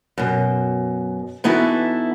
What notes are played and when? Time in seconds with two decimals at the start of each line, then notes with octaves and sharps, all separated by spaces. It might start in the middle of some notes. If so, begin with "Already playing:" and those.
0.18 F#2 B2
1.44 E3 B3 D#4 E4 F#4 A4